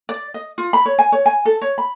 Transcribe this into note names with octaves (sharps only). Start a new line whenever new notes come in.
D5
D#5
F4
B5
C#5
G#5
C#5
G#5
A4
C#5
B5